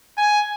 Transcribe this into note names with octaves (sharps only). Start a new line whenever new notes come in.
G#5